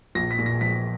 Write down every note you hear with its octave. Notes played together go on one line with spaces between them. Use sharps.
A#1 A#6
B6
A#2
A#6
F3 B6